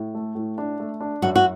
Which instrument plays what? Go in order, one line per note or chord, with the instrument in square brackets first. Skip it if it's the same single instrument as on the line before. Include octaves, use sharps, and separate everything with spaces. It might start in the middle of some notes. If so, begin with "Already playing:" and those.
Already playing: [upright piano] A2
A3
A2
D4
A3
D4
[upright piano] F#2 [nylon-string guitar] F#4
[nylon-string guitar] F#4